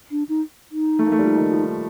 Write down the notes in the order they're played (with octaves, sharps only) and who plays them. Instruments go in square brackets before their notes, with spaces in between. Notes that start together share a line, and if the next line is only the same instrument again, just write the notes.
[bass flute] D4
D#4
D#4
[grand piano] A3
A#3
A3
G3
F3
D#3
F3